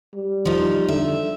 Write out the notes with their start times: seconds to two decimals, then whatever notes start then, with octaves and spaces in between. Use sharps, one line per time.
0.15 G3
0.45 F3 D#4
0.89 D3 E5